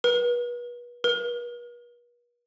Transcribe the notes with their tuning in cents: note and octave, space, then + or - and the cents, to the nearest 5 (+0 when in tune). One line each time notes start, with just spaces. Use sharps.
B4 -35
B4 -45